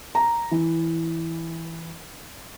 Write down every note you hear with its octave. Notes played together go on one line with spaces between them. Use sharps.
A#5
E3